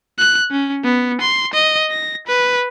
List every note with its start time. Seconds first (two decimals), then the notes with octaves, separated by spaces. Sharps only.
0.18 F#6
0.51 C#4
0.84 B3
1.21 C6
1.53 D#5
1.91 A#6
2.27 B4